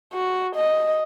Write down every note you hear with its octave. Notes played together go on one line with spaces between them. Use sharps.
F#4
D#5